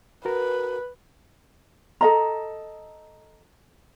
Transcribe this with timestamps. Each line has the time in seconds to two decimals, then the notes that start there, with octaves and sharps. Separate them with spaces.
0.25 F#4 A#4 B4
2.01 A4 D#5 A#5